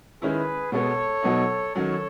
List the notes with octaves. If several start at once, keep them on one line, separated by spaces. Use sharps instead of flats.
D#3 G#3 C#4 E4 G#4 B4
B2 G#3 B3 A4 C#5
B2 F#3 B3 D#4
D#3 F#3 C#4 A4 C#5